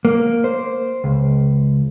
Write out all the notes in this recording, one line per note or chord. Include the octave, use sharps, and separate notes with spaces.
A#3
C5
C#2